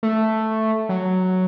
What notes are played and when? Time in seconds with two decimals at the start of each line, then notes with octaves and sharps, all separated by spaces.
0.03 A3
0.89 F#3